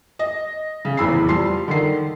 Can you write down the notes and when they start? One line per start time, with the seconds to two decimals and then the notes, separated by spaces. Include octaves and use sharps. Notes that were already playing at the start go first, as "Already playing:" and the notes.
0.19 D#5
0.85 C#3
0.97 F1 E2 A2 B5 E6 C7
1.28 F3 G3 A5 C6 C7
1.68 D3 D#3 C7